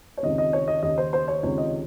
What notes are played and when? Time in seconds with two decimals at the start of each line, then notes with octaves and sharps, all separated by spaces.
0.17 C#5
0.23 C#2 C3 D#3 D#5
0.38 D#5
0.53 C#5
0.68 D#5
0.83 D#2 C#3 D#5
0.98 C5
1.13 C5
1.28 C#5
1.43 C#2 C3 D#3 C#5
1.58 D#5